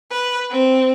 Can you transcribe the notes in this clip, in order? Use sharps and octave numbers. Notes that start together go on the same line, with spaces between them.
B4
C4